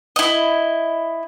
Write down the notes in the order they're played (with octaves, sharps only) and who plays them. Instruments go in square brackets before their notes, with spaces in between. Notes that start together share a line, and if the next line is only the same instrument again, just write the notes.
[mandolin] E4 D#5